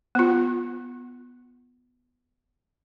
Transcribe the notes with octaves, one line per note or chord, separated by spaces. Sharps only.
B3 F4